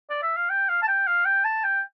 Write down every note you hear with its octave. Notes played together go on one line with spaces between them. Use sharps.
D5
E5
F5
G5
F5
A5
G5
F5
G5
A5
G5